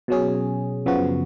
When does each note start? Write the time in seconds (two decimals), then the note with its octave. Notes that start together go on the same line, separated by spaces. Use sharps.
0.08 B2 F#3 C#4 G#4
0.86 F#2 C#3 F3 B3 F#4